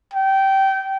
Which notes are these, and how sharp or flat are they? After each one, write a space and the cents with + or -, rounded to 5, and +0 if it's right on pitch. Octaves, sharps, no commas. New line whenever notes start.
G5 -20